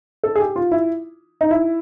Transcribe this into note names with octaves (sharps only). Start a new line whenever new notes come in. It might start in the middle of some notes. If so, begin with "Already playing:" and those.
A4
G#4
G4
F4
E4
D#4
E4